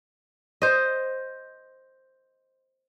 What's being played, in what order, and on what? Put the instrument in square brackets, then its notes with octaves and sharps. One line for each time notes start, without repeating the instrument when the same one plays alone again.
[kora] C5 D#5